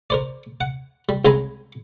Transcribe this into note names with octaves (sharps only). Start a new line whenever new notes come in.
A#4 C5 D5
F#5
G3
C2 C#3 G#3 G#5 A#5 B5